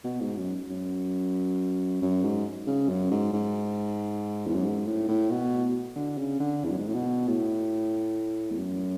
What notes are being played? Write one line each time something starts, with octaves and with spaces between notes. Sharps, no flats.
B2
G#2
F#2
F#2
F#2
G#2
C#3
F#2
G#2
G#2
E2
F#2
G#2
A2
A2
B2
D3
C#3
D3
E2
F#2
G#2
A2
B2
A2
E2
F#2